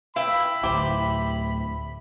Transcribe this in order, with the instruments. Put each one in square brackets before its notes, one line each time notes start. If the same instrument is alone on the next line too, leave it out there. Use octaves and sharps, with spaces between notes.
[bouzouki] E4 B4 G5 [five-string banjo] F5 [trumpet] B5
[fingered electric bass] D2 A2 [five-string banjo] G4 C5